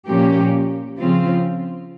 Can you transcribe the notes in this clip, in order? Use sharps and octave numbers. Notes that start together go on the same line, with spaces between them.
A#2 F3 A#3 C#4 G4
C#3 F3 C4 F4